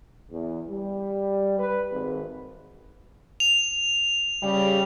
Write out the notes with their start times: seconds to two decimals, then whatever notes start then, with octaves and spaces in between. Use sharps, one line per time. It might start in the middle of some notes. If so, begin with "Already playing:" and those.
0.31 E2
0.69 G3
1.59 B4
1.92 G#1
3.40 F7
4.43 C#3 G3